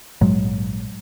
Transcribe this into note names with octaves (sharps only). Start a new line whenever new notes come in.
A#1 G#2 F#3 G#3